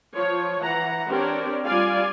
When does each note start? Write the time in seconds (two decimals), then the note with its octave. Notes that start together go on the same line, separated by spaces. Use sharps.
0.15 F3 C#5
0.62 E3 F#5 A#5
1.08 C4 D4 G4 A#4 C#5 D5
1.66 G3 F4 D5 F5 G#5